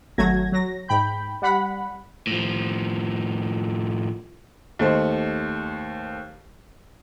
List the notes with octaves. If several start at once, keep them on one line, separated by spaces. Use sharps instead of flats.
G#1 F#3 A3 F#4 G#6 A#6
F#3 A#6
G#2 G5 B5 G6
G3 F#5 B5
A2 F3
D#2 A3 C5 D#5